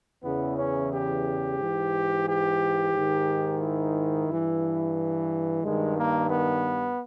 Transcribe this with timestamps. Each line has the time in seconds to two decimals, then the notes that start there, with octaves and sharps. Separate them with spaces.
0.23 E2 C#3 E3 B3
0.57 C#4
0.91 G4
1.58 G#2 E3
2.26 G4
2.93 G#2 D#3
3.61 E4
4.28 G2 E3
5.63 G2 D#3 G#3
5.96 A#3
6.30 B3